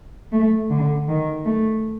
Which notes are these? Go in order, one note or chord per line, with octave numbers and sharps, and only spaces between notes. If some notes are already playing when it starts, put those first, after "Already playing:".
A3
D3
D#3
A3